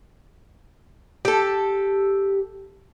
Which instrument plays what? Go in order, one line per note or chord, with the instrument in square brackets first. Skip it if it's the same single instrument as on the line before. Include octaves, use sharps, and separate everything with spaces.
[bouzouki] G4 A4